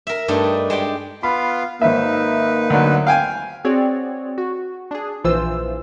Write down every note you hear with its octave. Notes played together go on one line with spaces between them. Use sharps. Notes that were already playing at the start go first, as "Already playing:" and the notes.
A#4 E5
G2 A3 D4 D#4
G#3 G4 D5 G5
B3 F4 F5 B5
G#1 A#3 D#4 B4 E5
D2 F#3
F5 G5 G#5
C4 F#4 G#4 C#5 D5
F#4
D4 G#4
A#1 E3 F4 C5 E6